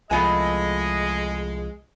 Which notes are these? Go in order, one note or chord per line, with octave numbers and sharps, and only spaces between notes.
C2 F3 G#3 A3 B3 D#5 G#5